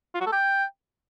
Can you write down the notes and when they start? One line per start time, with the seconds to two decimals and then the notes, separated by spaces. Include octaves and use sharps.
0.15 F4
0.21 F#4
0.26 A4
0.32 G5